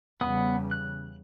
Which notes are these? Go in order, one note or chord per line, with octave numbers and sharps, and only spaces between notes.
E2 C#3 G3 B3 F#5 D#6
F#6